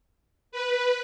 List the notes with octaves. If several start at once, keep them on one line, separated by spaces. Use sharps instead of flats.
B4